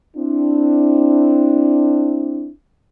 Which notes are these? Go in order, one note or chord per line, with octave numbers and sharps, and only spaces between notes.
C4 D4 E4